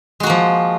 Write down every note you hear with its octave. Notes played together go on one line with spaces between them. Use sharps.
F3 G#3 A#3 F#4